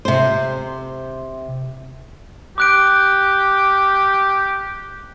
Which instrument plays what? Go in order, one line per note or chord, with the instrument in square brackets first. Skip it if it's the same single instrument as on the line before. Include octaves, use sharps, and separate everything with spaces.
[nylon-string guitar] C3 C5
[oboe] G4 [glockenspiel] D6 F#6 D7